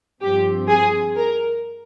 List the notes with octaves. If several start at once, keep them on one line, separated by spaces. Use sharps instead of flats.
G2 F3 C4 G4
G#4
A#4